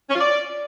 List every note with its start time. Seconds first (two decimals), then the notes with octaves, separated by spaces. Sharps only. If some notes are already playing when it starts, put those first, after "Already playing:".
0.10 C#4
0.15 F4
0.20 D5